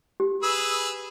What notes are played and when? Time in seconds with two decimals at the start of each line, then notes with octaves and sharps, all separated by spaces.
0.20 G4
0.43 G#4 B4 E6